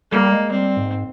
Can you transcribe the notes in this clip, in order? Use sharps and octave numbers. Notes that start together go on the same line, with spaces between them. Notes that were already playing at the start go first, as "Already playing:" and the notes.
G3 A#3
G#3
G3 C4
G#2